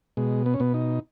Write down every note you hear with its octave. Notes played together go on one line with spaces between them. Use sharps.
B2 G#3
B3
C#4
B2 B3
D#4